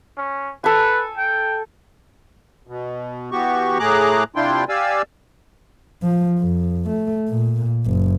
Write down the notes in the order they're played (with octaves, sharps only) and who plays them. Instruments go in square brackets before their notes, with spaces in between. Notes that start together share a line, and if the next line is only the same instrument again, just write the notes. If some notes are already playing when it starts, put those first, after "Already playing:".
[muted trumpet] C#4
[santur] A4 G#5 [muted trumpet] B4
[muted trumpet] G5
[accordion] B2
E3 B3 F#4 G4 C#6
A2 A3 G#4 A#5 D6 F#6
C3 D4 E4 F4 G5 C6
G4 D5 F5 G#5 E6
[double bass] F3
F2
A3
A#2
F#1